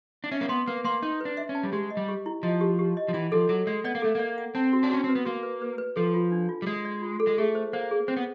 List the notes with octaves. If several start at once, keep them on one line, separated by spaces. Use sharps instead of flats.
D4
C#4 E5
A#3
B3 C6
A#3 B4
A#3 C6
D#4 C6
D4 B4
E5
C#4
A5
G3
G#3 G4
D#5
G3
G4
E4
F3 D#5
G4
G4
D#5
F3
E3 F#5
F3 A4
F#3 A4
G#3 D5
B3 D5
A#3
A3 A4
A#3 D5
F#5
C4 A5
F#4
D4
C#4 F#4
C4 B4
B3
A#3 F#4
B4
B4
B4
F3 A4
F4
D4
F4
G3
G#3 D5
D5
F4
A4
G#3
A3 G#4
C5
A#3 C5
G#4
C4 C5
B3